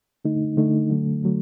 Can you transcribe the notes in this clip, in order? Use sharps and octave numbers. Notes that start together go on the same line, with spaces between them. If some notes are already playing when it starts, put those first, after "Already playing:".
D3 A3 D#4
D3 A3 D#4
D3 F#3 A3
D3 F#3 A3